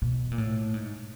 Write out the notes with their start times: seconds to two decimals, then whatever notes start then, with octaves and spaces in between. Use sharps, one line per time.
0.02 B2
0.32 A#2
0.38 A2
0.74 G#2